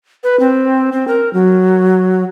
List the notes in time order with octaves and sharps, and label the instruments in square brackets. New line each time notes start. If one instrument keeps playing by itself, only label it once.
[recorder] B4
C4
C4
A#4
F#3